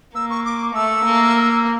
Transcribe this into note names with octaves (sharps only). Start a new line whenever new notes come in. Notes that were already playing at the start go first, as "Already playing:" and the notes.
A#3 E6
C#6
D6
A3 E6
A#3